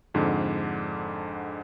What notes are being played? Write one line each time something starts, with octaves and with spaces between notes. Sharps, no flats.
F2 G#2 D3